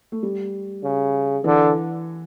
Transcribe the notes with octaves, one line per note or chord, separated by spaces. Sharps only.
A3
G3
C#3
D3 E3